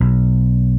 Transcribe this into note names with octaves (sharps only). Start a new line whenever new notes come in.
B1